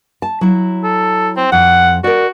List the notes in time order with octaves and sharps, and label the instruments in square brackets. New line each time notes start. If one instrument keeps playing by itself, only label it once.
[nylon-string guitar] A5
F#3 E4
[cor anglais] A4
C4
[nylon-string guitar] F2 [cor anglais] F#5
[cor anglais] F#4 [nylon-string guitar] A#4 D5